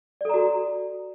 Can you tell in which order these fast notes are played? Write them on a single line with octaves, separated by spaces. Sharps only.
D5 A4 A#5 F#4